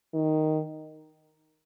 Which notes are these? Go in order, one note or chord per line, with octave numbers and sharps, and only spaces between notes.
D#3